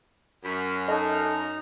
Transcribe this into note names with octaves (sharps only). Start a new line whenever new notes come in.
F#2 B5
D#4 A4 D#5 A#5